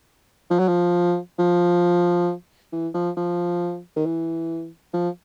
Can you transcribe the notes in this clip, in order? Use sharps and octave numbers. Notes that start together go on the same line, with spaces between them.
F3
F#3
F3
F3
E3
F3
F3
D#3
E3
F3